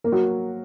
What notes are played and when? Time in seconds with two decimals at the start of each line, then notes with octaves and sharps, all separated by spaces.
0.04 A#3 A#4
0.12 F#3 F#4